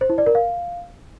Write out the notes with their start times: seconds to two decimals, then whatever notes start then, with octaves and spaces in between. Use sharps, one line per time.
0.01 C5
0.10 E4
0.18 D5
0.26 A#4
0.35 F5